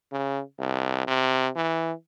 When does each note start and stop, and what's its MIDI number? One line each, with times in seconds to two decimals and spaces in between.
0.12 0.41 49
0.59 1.03 36
1.07 1.49 48
1.56 1.92 52